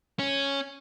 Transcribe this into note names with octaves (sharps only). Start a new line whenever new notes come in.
C#4